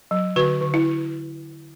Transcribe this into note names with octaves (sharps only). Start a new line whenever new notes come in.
F#3
D3 F#4 B4
D3
E4